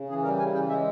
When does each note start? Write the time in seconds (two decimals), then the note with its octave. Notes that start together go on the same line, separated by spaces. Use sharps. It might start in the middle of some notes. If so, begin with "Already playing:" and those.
Already playing: C#3
0.09 E3 G#4
0.24 G3 A#4
0.39 C#3 G#5
0.54 E3 G5
0.69 G#3 E5